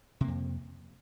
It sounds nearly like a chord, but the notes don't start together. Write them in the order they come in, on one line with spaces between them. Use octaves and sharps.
C3 A#3 F2